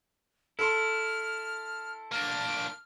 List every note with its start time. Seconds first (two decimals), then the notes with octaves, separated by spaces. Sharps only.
0.59 E4 A4 C6 F6
2.12 A#3 D4 F6